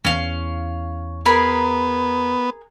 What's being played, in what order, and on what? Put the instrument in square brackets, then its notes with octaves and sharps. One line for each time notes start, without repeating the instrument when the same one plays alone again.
[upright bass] E2 E4 [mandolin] C#4 F5
[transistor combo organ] B3 [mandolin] G#4 A#4 B5